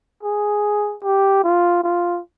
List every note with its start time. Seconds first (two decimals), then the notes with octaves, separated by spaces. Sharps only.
0.23 G#4
1.03 G4
1.43 F4
1.83 F4